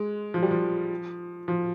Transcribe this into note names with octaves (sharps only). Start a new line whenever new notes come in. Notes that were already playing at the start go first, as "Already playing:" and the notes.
Already playing: G#3
F3
G3
F3
F3